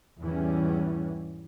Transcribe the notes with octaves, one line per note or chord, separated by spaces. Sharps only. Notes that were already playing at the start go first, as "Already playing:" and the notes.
E2 G#2 E3 G3 C#4